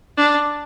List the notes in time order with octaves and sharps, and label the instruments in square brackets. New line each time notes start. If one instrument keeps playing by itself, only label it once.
[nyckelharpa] D4